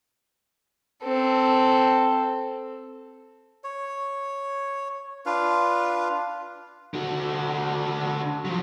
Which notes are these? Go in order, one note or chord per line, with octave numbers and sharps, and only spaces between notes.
C4 A4
C#5
D4 F4 B4 F5
D3 F#4
F3 F#3